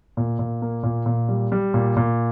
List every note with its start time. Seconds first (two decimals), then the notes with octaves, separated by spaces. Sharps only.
0.17 A#2
0.39 A#2
0.62 A#3
0.83 A#2
1.06 A#2
1.29 G3
1.52 G3
1.74 A#2
1.97 A#2